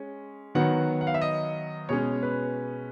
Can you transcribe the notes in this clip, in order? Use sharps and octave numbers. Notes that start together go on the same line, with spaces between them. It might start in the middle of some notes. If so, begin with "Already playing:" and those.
Already playing: G#3 C#4
D#3 F#3 B3 F#5
F#5
F5
E5
D#5
B2 G#3 C#4 C#5
B4